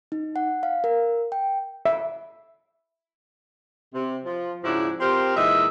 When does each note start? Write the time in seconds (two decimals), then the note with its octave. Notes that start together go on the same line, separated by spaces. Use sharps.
0.12 D#4
0.36 F#5
0.63 F5
0.84 A#4
1.32 G5
1.86 E5
3.94 C3
4.25 F3
4.64 G#2 C#3 F3 D4 E4 F#4
5.00 C4 F4 G4 A#4 C5
5.35 A#2 E3 G#3 D#4 E5